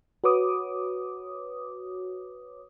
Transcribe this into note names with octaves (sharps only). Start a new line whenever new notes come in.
F#4 B4 C#5 D6 D#6